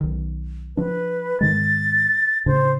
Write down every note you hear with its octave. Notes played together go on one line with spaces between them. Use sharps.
B1 D#3
F3 D4 B4
G#2 D#3 G#3 A6
A2 C#3 D4 C5